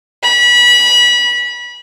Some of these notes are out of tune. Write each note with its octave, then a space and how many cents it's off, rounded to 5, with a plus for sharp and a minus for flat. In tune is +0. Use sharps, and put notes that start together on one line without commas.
B5 -25